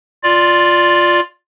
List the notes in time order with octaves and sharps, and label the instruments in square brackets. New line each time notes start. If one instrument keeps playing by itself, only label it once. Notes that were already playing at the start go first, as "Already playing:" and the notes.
[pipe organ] F4 D5